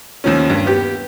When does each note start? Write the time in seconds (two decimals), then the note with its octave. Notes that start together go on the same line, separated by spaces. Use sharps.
0.24 D#2 D#3 F3 C#4
0.50 G2
0.66 B3 G4